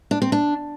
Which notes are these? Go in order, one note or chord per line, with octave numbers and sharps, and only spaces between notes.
D4
C4
D4